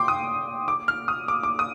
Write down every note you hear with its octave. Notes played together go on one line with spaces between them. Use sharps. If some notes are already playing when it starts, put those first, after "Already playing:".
Already playing: G5 C6 D6
D#6
D6
F6
D#6
D6
D6
D#6